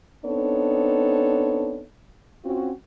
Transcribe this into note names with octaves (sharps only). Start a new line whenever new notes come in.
B3 C4 D4 D#4 A4 C#5
C4 C#4 F4 F#4